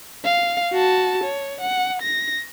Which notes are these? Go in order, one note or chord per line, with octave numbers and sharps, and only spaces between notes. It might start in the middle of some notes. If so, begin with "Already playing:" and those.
F5
F#4 A5
C#5
F#5
A#6